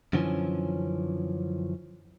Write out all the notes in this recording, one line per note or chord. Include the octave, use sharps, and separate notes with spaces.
F#2 D3 E3 F3 C#4